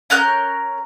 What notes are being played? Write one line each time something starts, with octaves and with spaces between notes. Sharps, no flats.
C#4 A#4 F#6 G6